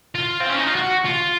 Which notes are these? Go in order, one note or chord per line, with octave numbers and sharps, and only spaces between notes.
F4
C4
C#4
D#4
F4
F#4
F4